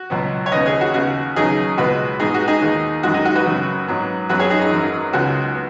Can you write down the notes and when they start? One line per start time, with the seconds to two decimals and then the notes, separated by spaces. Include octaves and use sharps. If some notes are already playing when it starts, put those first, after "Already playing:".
Already playing: F#4
0.10 C#2 B2 F#3 B3
0.46 C#5
0.52 D#2 C#3 B3 B4 D#5
0.66 G#4 C#5
0.81 F#4
0.94 D#2 C#3 B3 F#4
1.36 D#2 C#3 F#3 B3 D#4 G#4
1.78 C#2 B2 G#3 B3 F#4 B4
2.20 G#2 G#3 B3 D#4 G#4
2.34 F#4
2.48 D#4 G#4
2.62 D#2 D#3 B3
3.03 F#2 D#3 G#3 F#4
3.14 D#4
3.25 F#4
3.35 F#4 B4
3.46 F#2 C#3 B3
3.87 G#2 F#3 B3
4.29 F#2 F#3 B3 F#4 B4
4.39 G#4 C#5
4.50 D#4 G#4
4.61 D#4
4.71 G#1 F#2 F#3
5.13 C#2 C#3 G#3 B3 F#4
5.55 B3